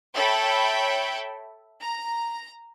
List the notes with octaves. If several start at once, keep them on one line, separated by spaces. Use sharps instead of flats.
A4 C#5 E5 G5 B5
A#5